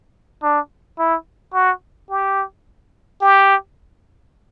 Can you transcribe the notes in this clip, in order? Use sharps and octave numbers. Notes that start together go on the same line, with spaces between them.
D4
E4
F#4
G4
G4